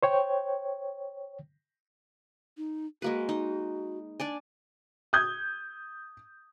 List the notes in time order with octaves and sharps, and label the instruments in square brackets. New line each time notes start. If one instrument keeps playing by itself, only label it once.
[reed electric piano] C5 C#5 G5
[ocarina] D#4
[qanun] G#3 A#3 B4 [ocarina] F#4
[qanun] D#4
D4 D5 G#5
[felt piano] D#6 G6 G#6